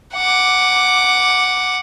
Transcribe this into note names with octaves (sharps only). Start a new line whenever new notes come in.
F#5 D6